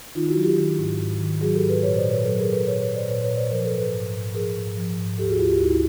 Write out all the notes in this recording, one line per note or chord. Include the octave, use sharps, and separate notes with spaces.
D#3 D#4 F4
E4 F#4
F#3
F4 G4
D#3
G#2
G#2
D#3
F#3 F#4 G#4
G4 A4
G#2
A4 B4
A#2 B4 C#5
C5 D5
A#2
B4 C#5
F#3 A4 B4
G#4 A#4
F#3
A4 B4
A#2 B4 C#5
B4 C#5
A#2
C5 D5
A#2 B4 C#5
B4 C#5
A#2
C5 D5
F3 A#4 C5
A4 B4
G#2
A4 B4
G#2
G#2
F3 G#4 A#4
G#2
F3
G#2
D2 G4 A4
F#4 G#4
D2 F4 G4
F4 G4
D2 E4 F#4
E4